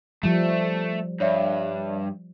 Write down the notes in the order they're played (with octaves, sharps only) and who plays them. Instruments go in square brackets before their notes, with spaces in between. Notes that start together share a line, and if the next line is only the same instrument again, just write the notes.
[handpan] F3 G3 [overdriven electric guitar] A3
[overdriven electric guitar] G2 [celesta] C#5 D5 E5